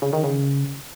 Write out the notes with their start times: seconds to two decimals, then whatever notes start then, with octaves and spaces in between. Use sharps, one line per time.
0.02 C#3
0.13 D#3
0.24 C#3